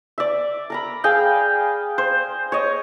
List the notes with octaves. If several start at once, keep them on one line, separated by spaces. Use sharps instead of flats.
D5 E5
A#4 A#5 B5
G#4 F5 G5
C5
C#5 D#5